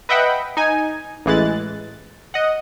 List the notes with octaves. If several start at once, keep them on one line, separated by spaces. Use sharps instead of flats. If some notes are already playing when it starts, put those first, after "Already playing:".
B4 D#5 E5 F#5 G5 B5
D#4 G#5
A1 E3 G#3 F#6 A6
D#5 F#5